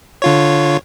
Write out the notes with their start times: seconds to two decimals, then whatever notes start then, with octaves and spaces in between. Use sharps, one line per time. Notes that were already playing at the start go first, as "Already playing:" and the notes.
0.22 D3 F4 C#5